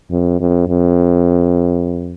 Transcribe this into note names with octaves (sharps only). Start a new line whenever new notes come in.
F2
F2
F2